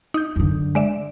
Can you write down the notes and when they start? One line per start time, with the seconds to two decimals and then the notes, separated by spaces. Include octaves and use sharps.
0.14 D#4 D#6 G6
0.36 F#2 D3
0.75 G#3 D5 E5